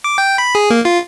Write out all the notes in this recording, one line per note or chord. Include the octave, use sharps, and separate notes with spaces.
D6
G5
B5
G#4
A#3
F4